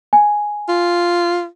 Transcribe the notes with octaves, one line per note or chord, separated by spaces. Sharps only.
G#5
F4